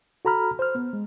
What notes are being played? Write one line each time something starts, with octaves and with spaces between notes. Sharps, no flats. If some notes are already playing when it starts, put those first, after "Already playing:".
F#4 A4 A#5 B5 F6
C5 F6
B3
G#3